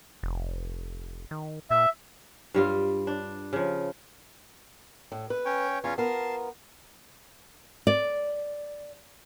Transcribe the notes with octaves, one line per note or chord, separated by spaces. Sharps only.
F1
D#3
A#2 E5
G2 G3 F4
D4
C#3 F3
A2
B4
C#4 C#5 G5
E2 C#4 F4 C#5
B3 F4 A#4 F5 A5
D5